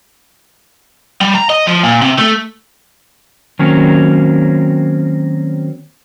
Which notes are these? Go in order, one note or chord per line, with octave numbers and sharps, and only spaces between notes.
G3
A#5
D#5
F3
A#2
C3
A3
D#3 F#3 A#3 C4 C#4